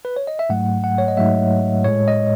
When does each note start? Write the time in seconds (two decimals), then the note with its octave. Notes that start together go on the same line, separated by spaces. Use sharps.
0.05 B4
0.16 C#5
0.27 D#5
0.39 E5
0.49 G#2 F#3 A3 F#5
0.84 F#5
0.98 C#5
1.08 D#5
1.17 G#2 F#3 A3 E5
1.84 A2 G#3 C#5
2.08 D#5